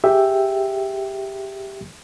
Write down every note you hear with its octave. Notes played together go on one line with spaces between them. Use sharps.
G4 G#4 E5 G5